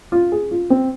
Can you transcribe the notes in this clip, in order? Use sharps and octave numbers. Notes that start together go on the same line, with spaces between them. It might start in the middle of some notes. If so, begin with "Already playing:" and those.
F4
G#4
F4
C4